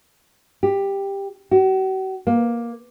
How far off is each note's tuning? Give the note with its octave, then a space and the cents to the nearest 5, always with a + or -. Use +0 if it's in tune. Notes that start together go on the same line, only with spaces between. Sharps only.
G4 +10
F#4 +45
A#3 +10